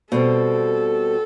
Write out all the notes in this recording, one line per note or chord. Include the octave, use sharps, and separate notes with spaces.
B2 G3 C4 A4